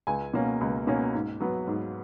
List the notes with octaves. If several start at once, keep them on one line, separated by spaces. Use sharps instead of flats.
C#2 G#5
B2 A#3 C#4
C#2
B2 A#3 C#4
G#2
F#3 B3
G#2